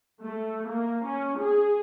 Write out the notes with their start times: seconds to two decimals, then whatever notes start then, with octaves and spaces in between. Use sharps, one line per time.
0.23 A3
0.68 A#3
1.05 C#4
1.40 G#4